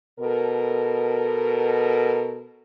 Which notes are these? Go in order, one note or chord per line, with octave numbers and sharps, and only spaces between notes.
B2 A4 A#4